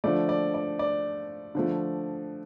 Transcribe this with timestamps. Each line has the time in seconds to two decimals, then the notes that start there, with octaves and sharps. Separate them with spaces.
0.04 D3 F3 A3 D5
0.29 D5
0.54 D5
0.79 D5
1.55 D3 F3 A3